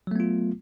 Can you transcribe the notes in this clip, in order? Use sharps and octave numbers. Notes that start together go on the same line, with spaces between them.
F#3 A3 B3 F4